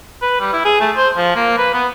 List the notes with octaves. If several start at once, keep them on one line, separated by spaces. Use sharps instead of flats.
B4
G3
E4
G#4
A3
C5
F3
A#3
B4
B3